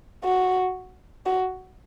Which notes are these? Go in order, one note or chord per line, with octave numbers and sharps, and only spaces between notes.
F#4
F#4